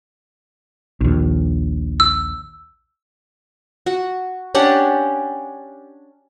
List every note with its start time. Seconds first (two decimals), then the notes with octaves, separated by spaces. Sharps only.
1.01 A#1 D#2
2.00 E6
3.86 F#4
4.55 C#4 D4 G4 F#5